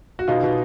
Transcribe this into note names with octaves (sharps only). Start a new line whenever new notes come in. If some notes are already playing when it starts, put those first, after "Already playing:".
F#4
B2 D#4 F4
B2